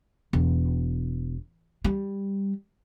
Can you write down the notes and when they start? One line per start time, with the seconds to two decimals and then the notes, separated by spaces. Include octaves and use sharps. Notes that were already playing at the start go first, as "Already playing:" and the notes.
0.33 E1
1.84 G3